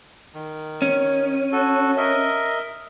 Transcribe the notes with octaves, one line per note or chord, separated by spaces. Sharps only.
D#3
C#4
F#4 A4
A#4 D#5 E5